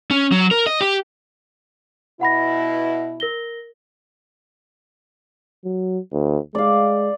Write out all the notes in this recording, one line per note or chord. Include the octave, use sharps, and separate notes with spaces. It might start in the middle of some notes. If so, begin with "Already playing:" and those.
C#4
F#3
A#4
D#5
G4
B2 E4 F#5 B5 A#6
A#4 A#6 G7
F#3
D2
G#3 D5 F5